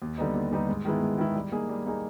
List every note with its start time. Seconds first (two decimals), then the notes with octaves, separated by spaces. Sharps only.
0.02 D#2
0.18 D3 G3 B3 D#4
0.34 D#2
0.52 D3 G3 B3 D#4
0.69 G#2
0.85 D#3 G#3 B3 E4
1.02 G#2
1.18 D#3 G#3 B3 E4
1.35 G3
1.51 A#3 D#4 G#4
1.69 G3
1.86 A#3 D#4 G#4